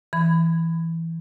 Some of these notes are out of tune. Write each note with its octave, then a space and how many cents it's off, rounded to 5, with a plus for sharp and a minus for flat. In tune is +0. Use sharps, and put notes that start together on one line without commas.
E3 +0 B5 +20